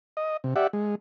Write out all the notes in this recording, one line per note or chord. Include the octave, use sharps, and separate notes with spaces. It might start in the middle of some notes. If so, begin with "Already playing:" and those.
D#5
C3
G4 D5 E5 F#5
G#3